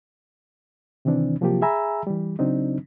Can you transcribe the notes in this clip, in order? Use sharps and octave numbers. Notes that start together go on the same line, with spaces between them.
C3 D#3 E3 C4 D4
C3 F3 F#3 A#3 F4 G4
G#4 E5 G#5 A#5 B5 E6
E3 G3
C#3 F#3 C4 D4 D#4